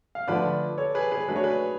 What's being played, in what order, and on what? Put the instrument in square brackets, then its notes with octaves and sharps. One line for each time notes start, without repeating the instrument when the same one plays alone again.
[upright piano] F5
[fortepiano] D3 F3 A3 [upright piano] B4 D5
[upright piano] A4 C#5
G#4 B4
G#4 B4
[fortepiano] F#3 A3 D4 F#4 [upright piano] B4
[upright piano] C#5
G#4 B4